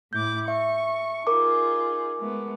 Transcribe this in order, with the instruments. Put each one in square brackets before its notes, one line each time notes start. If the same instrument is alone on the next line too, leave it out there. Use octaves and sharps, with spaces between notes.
[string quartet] A2 E4 D6 [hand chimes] G6
[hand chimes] E5 [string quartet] C#6
[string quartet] D#4 F4 G#4 [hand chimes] A#4 D6
[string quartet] G#3 A3 B3